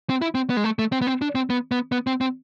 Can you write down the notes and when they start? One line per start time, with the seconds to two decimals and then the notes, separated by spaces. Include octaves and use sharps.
0.10 C4
0.22 E4
0.35 C4
0.50 B3
0.57 G#3
0.64 A3
0.79 A3
0.92 C4
1.01 B3
1.07 C4
1.22 D4
1.35 C4
1.50 B3
1.71 B3
1.92 B3
2.07 C4
2.21 C4